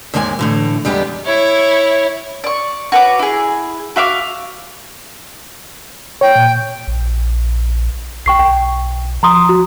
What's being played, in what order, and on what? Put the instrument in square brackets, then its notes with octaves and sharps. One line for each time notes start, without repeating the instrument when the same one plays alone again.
[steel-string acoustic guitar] D#2 G#2 D#3 G#3 G5 G#5
A2 D3 E3
E2 G3 G#3 B3 G4
[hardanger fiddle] E4 C#5
[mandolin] D5 C#6
F#4 B4 C#5 D6
E4 G#4
F#4 E5 F5 D6
[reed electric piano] C#5 [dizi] G5
[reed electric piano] A#2
[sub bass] A#1
[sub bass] B1 [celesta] G5 C#6 C7
[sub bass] B1 [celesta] G5
[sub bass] F3 [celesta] A#5 C6 D#6
[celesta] F#4